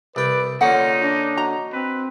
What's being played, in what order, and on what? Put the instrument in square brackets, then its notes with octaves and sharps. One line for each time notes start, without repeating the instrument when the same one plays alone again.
[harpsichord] C2 G5 [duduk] B4 [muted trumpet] D5
[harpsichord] D3 A#3 C#4 [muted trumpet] D#4 [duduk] F4 [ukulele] F#5
[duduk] D4
[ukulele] F#4 D#5 A#5
[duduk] C4 [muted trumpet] B4